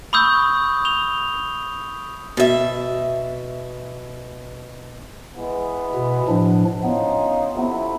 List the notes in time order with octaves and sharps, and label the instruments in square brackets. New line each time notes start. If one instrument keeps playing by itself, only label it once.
[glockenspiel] B5 C#6 D#6 E6 G6
F7 G7
[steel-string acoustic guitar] B2 E5
[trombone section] E3 G#3 B3
[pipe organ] B2
A2 F3 D4
[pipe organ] B3 [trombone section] C#4 D#4 F4
[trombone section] F2 C3 E4